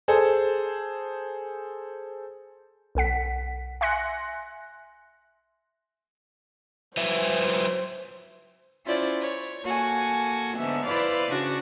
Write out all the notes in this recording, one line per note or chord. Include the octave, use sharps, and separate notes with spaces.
G#4 A4 C5
B1 A4 F#5 B6
E5 G#5 C6 F#6 A#6 C#7
F#3 B4 C5 E5
C#4 E4 F4 C5 D5
C#5
A#3 F#4 A4 G#5
G#2 D3 B3 E5
E4 B4 C5 D5 F5
C#3 D4 F#4 C#6